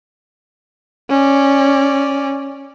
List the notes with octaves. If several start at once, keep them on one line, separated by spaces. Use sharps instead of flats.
C#4 D5